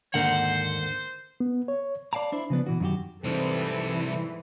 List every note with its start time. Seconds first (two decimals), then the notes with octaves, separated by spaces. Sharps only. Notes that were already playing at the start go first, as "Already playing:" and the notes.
0.14 D#2 G#2 D3 A#3 C5 F#5
1.40 B3
1.68 C#5
2.13 C#5 D5 F5 G5 A5 A#5
2.32 D4 E4 C5
2.50 C#3 F3 B3 D4
2.66 B2 E3 F#4
2.80 F#2 D#3 D#4 F#4 G4
3.24 G#2 C3 E3 G3 C4 D4 A4